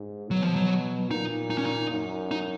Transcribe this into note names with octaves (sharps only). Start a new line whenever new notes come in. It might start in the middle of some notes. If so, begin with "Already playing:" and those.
Already playing: G#2
B2 F#3
F3
F#3
A#2 D#4
D#4
C#4
D#4
F#2
D#4